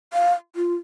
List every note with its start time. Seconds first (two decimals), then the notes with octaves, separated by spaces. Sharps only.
0.13 F5
0.56 F4